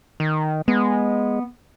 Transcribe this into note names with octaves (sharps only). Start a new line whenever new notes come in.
D#3
G#3 B3